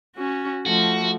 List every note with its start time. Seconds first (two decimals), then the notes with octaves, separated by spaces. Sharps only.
0.16 C#4 F#4
0.66 F3 A3 F#4